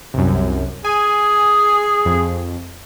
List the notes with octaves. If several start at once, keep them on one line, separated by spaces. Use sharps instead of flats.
C2 F#2
G#4 G#5
F2